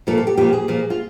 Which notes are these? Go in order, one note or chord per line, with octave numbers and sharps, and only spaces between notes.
A#2 F3 A4
A4
G4
A#2 F3 G4
G#4
A#2 F3
F4